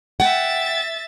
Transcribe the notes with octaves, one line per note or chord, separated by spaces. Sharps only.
E5 F#5 G5 A6